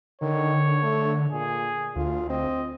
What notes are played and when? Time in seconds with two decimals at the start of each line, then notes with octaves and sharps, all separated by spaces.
0.22 D3 D#3 C#5
0.83 A3
1.32 A#2 G#4
1.96 D2 F4
2.30 C4 D#5